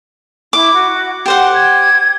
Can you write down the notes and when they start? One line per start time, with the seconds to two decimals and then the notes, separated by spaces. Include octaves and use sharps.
0.53 E4 D6
0.73 F#4
1.26 G4 C5 F#5 G5
1.53 G#6